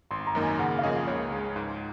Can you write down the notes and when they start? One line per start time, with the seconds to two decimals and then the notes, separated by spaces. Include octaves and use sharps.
0.11 G#1 C6
0.27 A#5
0.35 F#2 D#3 A#3 D#4
0.43 G#5
0.59 C#3 F#5
0.79 F5
0.83 F3 A#3 C#4 G#4 D#5
1.07 C#2 C#5
1.32 C#3 G#3
1.56 G#2